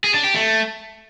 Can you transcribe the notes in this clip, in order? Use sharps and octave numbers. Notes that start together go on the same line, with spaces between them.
G#4
D4
G4
A3